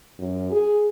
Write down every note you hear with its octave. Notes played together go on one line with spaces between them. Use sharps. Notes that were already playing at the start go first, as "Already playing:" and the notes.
F#2
G#4